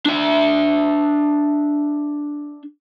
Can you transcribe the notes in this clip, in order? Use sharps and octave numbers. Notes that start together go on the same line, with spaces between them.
D4 E5